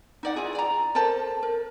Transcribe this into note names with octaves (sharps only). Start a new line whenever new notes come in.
D#4 D5 F#5
E4 F4 G#4
D5 A#5
A4 A#4 C5 A5
A#4